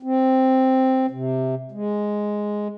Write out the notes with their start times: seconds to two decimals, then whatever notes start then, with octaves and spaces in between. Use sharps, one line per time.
0.03 C4
1.11 C3
1.72 G#3